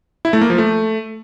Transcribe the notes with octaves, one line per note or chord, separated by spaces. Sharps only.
E4
A3
A#3
F3
A3